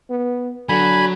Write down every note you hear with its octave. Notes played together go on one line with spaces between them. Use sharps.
B3
D3 F#3 G#5 B5